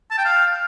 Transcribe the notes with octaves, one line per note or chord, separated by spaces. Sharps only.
A5
G5
F5